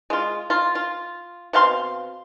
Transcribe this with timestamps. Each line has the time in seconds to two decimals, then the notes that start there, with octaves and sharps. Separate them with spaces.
0.10 G#3 F4
0.50 F4
0.75 F4
1.53 B2 C4 F5 C6